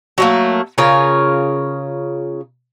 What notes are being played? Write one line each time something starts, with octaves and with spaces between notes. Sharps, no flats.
F#3 A3 A#3
C#3 F4 A#4 C#5